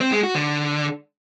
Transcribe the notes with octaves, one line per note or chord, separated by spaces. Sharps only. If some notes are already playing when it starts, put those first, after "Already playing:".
C4
G#3
F#4
D3